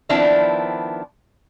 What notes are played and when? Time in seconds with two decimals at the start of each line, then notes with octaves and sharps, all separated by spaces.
0.09 D#3 F3 B3 C4 D4 E4